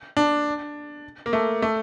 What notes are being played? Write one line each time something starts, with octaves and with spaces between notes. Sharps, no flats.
D4
A#3
A3
A3